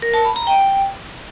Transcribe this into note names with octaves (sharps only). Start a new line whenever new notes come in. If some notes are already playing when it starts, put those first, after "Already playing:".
A#4
A5
B5
A#5
G5